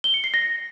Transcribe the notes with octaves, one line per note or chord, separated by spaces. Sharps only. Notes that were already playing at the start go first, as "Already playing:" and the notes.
G7
C#7
C7
A#6